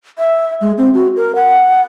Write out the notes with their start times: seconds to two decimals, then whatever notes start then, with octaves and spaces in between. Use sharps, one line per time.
0.18 E5
0.61 G#3
0.78 C4
0.94 F#4
1.16 A#4
1.35 F#5